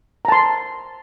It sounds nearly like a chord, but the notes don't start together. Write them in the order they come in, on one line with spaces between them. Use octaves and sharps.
A#5 A5 C6